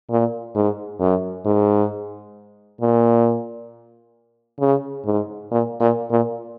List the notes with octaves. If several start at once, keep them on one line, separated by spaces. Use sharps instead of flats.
A#2
G#2
F#2
G#2
A#2
C#3
G#2
A#2
A#2
A#2